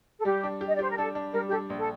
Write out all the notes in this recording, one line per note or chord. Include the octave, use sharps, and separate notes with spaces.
A4
G3 G4
D4
G4
D#5
D5
G4 C5
A#4
D4 A4
D4
G3 A#4
G4
D4 A4
A#1
A4